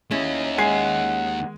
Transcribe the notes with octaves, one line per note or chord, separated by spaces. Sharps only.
D#2 C#4 E4 G#4 D#5
G#3 F#5 G#5 C7